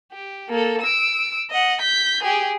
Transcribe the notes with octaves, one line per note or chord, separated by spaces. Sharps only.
G4
A#3 A4
E6 D7
D#5 F#5
G6 B6
G4 G#4